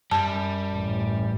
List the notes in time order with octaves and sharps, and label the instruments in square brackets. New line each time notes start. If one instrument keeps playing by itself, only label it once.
[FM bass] F#2 [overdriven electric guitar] G3 [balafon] A5
[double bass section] A1